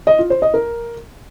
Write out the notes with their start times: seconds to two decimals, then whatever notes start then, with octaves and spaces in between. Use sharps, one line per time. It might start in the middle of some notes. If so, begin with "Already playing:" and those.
0.07 D#5
0.19 F4
0.30 C5
0.42 D#5
0.54 A#4